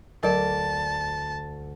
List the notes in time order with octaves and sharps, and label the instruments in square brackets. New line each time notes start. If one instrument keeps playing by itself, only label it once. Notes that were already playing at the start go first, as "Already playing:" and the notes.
[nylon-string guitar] D2 A4 D5 [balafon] F#3 A#4 D#5 [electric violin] A5